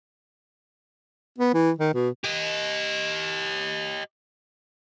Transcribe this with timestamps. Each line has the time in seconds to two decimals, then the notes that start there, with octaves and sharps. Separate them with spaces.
1.38 B3
1.54 E3
1.78 D#3
1.94 B2
2.24 G4 D#5